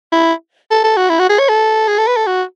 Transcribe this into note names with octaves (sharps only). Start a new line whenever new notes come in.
E4
A4
A4
F#4
E4
F#4
G#4
C#5
A4
G#4
A4
B4
A4
F#4